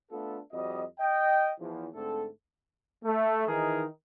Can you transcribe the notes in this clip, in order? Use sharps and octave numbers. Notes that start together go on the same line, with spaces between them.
A3 B3 D4 F4 A4
F2 G3 C4 F#4 D#5
D#5 G5
E2 E3 F3
G#2 D3 A3 C4 A4
A3
D#3 E3 D#4 G#4 A#4